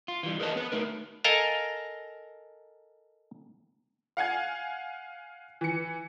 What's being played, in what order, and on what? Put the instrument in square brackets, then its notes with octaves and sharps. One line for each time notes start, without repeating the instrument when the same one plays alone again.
[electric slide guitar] F4
E3 G3
G#4 A#4 B4 C#5 D#5 A5
B3 B4
A3 D#4 A#4
[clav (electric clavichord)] A4 A#4 D#5 F5 G#5 A#5
[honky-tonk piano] F5 F#5 G#5 G#6
E3 C#7